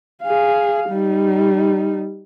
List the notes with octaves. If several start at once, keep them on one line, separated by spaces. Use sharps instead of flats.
G#4 F5
G3 D#4